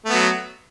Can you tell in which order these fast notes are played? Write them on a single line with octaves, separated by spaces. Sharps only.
A3 B3 F#3